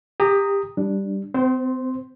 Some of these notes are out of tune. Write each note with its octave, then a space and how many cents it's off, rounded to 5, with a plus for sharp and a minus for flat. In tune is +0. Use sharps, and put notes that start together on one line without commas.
G4 +25 A#5 -10 D#6 +0
G3 +0 D4 +0
C4 -40 C5 +0 C6 +0